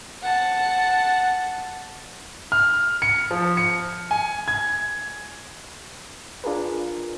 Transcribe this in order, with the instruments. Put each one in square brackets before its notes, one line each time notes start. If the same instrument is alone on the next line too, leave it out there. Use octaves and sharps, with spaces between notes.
[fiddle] F#5 A5
[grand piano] F6
C#7
F3
C#7
G#5
G#6
[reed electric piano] D4 F4 G#4 A#4 B4